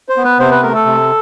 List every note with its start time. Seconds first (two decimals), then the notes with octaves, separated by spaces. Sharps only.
0.09 C5
0.17 B3
0.24 B4
0.39 C3 C5
0.51 B4
0.62 A3 A#4
0.74 A4
0.85 C3